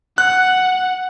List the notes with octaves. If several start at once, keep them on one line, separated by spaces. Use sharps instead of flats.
F#5 F#6